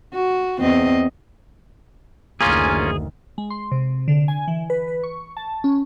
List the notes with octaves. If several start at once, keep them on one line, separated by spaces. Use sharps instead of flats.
F#4
E2 C4 D#5
F#1 D2 D#3 A#3 C#4 F4 G#4
G#3
C6
C3
D3
G#5
E3
B4
B4
C#6
A5
C#4